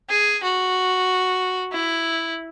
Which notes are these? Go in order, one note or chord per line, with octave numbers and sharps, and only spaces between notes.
G#4
F#4
E4